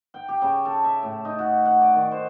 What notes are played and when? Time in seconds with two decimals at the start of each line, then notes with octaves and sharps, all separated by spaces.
0.14 G5
0.28 G4
0.42 C#3
0.65 A4
0.84 E5
1.03 A2
1.25 D#4
1.39 F#4
1.65 F#5
1.81 D5
1.94 D#3
2.11 C5